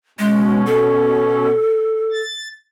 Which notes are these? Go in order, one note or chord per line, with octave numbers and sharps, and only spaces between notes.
B2 G#3 C#4
A4
A6